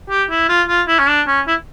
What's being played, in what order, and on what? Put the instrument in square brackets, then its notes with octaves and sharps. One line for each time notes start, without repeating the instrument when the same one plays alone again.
[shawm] G4
E4
F4
F4
E4
C#4
D4
C#4
E4